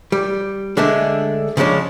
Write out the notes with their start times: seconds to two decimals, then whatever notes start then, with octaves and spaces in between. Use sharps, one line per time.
0.12 G3
0.77 D3 G#3 A3 D4
1.57 C#3 F3 G#3 C#4 D4